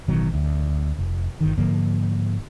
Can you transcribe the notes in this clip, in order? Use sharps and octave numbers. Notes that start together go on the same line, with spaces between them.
A1 B2 D#3 F#3
D2
F1
G1 D#3
G#2 D3 F3 A#3